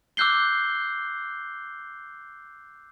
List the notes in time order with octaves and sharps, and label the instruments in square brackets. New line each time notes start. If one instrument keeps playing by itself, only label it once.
[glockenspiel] D6 E6 F#6 G6 C7 G7